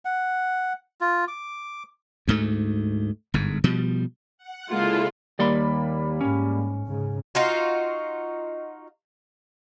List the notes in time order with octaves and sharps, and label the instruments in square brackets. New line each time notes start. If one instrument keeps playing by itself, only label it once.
[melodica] F#5
F4
D6
[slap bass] D2 G#2 A3
G1 G#2
B2 F3 G3
[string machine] F#5
[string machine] C#3 E4 A4 [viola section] G#3 A#3 F4
[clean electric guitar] D#2 D5 C6 [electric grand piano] G3 A#3 B5
[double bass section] G#2 [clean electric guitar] C#4
[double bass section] G#2 C#3
[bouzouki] D#4 F4 F#4